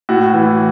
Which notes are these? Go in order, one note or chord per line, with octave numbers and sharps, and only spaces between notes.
A2 F#4
E3